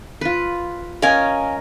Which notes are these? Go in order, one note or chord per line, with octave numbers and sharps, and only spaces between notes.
F4 B4
C#4 A#4 D#5 F5 G#5